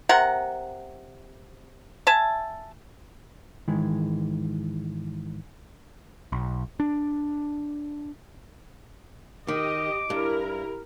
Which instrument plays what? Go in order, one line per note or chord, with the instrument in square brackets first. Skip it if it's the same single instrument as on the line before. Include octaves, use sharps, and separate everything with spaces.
[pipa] C3 A#4 F#5
E5 G#5 A5
[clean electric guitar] G#2 D#3 E3 G#3
[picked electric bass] B1
D4
[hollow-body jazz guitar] D#3 [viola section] G4 D#5 [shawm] D6
[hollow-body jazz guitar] G2 [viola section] E4 A#4 [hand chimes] G4